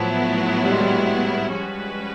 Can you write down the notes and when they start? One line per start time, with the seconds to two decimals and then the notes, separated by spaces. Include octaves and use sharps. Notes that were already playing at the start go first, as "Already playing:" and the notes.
Already playing: A2 F3 F#3 B3 E4
0.64 G3
0.72 G#3
0.80 G3
1.54 F3 G#3 C#4 F#4 B4